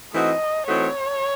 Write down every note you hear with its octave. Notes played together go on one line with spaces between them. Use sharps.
E3 A3 C4 D#4 F#4 D#5
E3 A3 C4 D#4 F#4 C#5